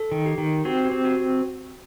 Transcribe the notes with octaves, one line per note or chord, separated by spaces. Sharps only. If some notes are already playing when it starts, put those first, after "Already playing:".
Already playing: A4
D#3
G4
D#3
C4 F#4
G4
C4
F#4